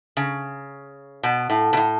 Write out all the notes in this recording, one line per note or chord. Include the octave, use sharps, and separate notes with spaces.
C#3
B2
A2
B2
A2